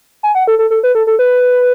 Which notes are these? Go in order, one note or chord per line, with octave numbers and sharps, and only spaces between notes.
G#5
F#5
A4
A4
A4
B4
A4
A4
B4